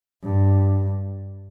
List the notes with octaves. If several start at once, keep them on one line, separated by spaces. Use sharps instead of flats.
G2